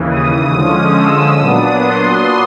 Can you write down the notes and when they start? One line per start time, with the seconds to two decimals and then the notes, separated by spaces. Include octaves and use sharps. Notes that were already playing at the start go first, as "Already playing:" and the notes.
Already playing: D#2 C#3 E3
0.09 D#6
0.52 D3 F3 G#3 C#4 D#6
0.96 E6
1.41 A#2 F#3 B3 D4 D#6
1.84 C6